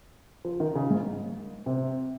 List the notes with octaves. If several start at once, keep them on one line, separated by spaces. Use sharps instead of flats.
F3
D#3
C#3
G#2
C3